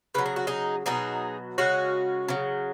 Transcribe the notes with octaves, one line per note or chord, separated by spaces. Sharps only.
C#3 F#3 B4
G#4
F#4
D#4 G#4
B2 F#3 D#4 G#4
C#3 G#3 C#4 F#4
C#3 F#3